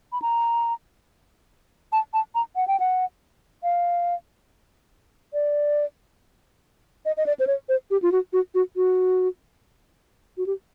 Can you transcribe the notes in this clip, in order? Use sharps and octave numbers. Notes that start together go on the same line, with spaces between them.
B5
A#5
A5
A5
A#5
F#5
G5
F#5
F5
D5
D#5
D#5
D5
C5
C#5
C5
G4
F4
F#4
F#4
F#4
F#4
F#4
G4